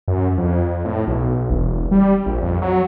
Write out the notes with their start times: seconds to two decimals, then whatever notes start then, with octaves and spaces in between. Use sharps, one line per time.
0.08 F#2
0.38 F2
0.85 A2
1.07 B1
1.50 E1
1.91 G3
2.26 A#1
2.42 F2
2.62 F#3